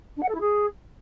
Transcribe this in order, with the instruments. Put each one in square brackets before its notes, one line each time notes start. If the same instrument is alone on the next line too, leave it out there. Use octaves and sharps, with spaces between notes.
[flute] D4
F#5
A4
E4
G#4